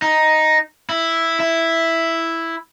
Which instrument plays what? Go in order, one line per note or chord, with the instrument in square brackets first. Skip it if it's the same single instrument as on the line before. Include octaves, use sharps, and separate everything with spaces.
[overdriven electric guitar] D#4
E4
E4